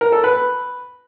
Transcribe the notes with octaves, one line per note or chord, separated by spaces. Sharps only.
A#4
A4
B4